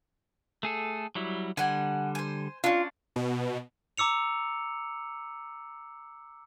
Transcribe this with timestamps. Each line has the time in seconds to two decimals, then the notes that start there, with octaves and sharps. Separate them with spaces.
0.63 A3 G#4 A4
1.15 F#3 G3 E4
1.57 D3 G3 F#5 G#5
2.15 C5 G#5
2.64 C#4 D4 F4
3.16 B2
3.98 A#5 D6 E6 C#7 F7